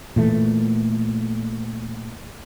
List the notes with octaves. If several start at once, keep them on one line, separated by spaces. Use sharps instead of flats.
A#2 E3 A3